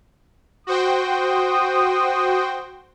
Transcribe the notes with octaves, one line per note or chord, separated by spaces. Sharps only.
F#4 C5 G5 D#6